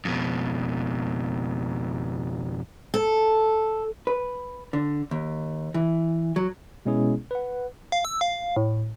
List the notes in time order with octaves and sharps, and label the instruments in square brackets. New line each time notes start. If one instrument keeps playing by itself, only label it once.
[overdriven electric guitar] F2 B2
[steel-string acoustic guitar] A4
[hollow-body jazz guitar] B4
D3
D#2
E3
F#3
[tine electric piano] B2 G#3 B3 C#4 E4 G#4
B4 F#5
[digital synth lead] F5
E6
F5
A2